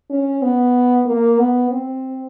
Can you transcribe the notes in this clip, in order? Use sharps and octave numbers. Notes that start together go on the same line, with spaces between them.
C#4
B3
A#3
B3
C4